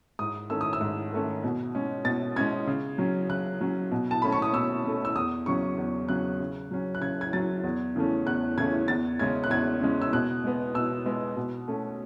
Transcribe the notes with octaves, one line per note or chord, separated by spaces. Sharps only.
G#2 D#6
D#3 A3 C#4 E6
D#6
E6
G#2
D#3 A3 C#4
B2
G#3 C#4
B2 A6
G#3 C#4 G#6
C#3
F#3 C#4
C#3 F#6
F#3 C#4
B2
A5
A3 C#4 B5
C#6
D#6
B2 E6
A3 C#4
E6
E2 D#6
C#3 F#3 C#4 C#6
E2
C#3 F#3 C#4 F#6
C#3
F#3 C#4
F#6
C#3 G#6
G#6
F#3 C#4 A6
E2
C#3 E3 A3 C#4
E2 F#6
C#3 E3 A3 C#4 G#6
E2 A6
C#3 G#3 C#4 G#6
F#6
E2 G#6
C#3 G#3 C#4
E6
B2 F#6
G#3 B3
B2 E6
G#3 B3
B2
A3 C#4